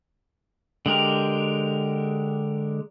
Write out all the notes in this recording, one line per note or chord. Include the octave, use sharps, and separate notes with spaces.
D3 G#3 G4 A#4